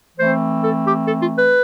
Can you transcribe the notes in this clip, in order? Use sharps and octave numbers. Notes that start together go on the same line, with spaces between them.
E3 A3 C4 C5
A4
G4
A4
F4
B4